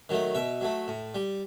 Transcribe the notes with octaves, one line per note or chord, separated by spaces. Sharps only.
D#3 F#3 A3
B2 E5
F#3 A3
A2
G3